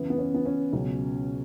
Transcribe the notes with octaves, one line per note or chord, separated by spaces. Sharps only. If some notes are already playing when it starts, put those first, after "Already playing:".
Already playing: F#2 C#3 E3 B3
B3
C#4
B3
C#4
C#2 B2 F#3